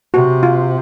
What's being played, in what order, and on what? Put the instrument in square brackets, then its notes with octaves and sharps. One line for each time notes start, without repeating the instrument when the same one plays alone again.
[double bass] C3 [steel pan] F#4
[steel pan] F4